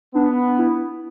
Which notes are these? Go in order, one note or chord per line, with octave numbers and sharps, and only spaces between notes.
B3 D4
E4